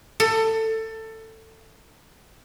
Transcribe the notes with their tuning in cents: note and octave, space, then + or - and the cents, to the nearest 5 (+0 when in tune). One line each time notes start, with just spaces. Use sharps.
A4 +20